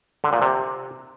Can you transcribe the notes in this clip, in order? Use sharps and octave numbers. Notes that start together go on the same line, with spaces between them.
D3
A#2
C3